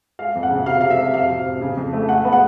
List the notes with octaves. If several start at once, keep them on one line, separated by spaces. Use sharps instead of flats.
G#3 F5
F2
F#5
C#3
C3 F5
C3 F5
E5
C3
F2 F5
C3
C3
C#3
F2
A3
G#3 F#5
B3
F#5